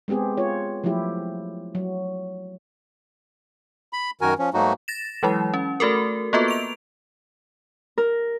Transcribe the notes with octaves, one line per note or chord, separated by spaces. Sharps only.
G#3 B3 C4 G4 G#4
F4 C#5
F3 F#3 A3 E4 G4
F#3
B5
F#2 D#3 F#4 A#4 G#5
F3 C#4
G#2 F#3 A3 A#3 D#4 F#4
A6 A#6 E7
E3 F#3 G#3 E4
C#4
A3 F#4 A4 A#4
A#3 B3 F4 F#4 A4 B4
D7 F7
A#4